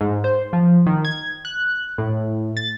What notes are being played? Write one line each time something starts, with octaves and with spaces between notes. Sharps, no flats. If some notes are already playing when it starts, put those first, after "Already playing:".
G#2
C5
F3
D#3
G#6
F#6
A2
A6